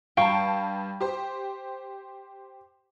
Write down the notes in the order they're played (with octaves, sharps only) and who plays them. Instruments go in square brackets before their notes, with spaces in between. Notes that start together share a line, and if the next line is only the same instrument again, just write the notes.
[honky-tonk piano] G2 A5 [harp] F5 G5 C#6
[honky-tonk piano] G4 C5